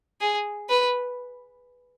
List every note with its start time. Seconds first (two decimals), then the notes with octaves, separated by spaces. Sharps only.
0.21 G#4
0.69 B4